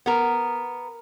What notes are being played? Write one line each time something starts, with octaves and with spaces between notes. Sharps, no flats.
B3 A#4